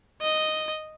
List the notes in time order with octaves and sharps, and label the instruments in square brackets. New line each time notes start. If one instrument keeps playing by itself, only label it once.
[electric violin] D#5